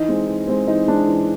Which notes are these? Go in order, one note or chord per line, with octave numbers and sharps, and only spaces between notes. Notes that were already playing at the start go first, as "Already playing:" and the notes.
Already playing: E3 D#4
G#3 C4
E3
G#3 C4
E3 D#4
G#3 C4 D4
E3